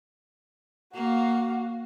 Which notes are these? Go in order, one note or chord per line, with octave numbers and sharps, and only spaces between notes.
A#3 F#4 F5